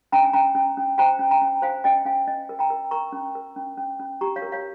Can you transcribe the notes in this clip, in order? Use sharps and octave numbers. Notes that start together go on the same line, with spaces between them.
C#4 G5 A#5
G#5
C#4 G5 A#5
C#4
C#4
C5 G5 A#5
C#4
G5 A#5
C#4
C5 F5 G#5
C#4 D#5 G5
C#4 F5 G#5
C#4 D#5
A#4
G5 A#5
A#4
A#4 A#5 C#6
C#4
A#4
C#4
C#4
C#4
G4 A#5 C#6
C#5 F5
A#4
C#5 F5